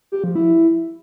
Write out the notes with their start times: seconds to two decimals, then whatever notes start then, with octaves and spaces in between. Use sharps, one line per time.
0.12 G4
0.24 F3
0.36 E4